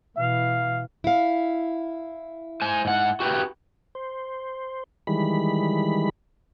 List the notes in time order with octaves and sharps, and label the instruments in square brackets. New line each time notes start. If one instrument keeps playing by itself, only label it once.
[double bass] B2 E3 [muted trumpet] F5
[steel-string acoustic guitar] E4 F5
[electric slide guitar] C5 G#5
G#2 F#5
F#4 G4 B4
[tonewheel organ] C5
D#3 E3 G3 G#3 B5